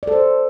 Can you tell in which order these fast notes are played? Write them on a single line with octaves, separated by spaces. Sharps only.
D5 A4 C5